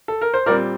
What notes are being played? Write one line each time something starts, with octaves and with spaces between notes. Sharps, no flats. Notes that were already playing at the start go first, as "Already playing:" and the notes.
A4
A#4
C5
A#2 G3 C4 A#4 D5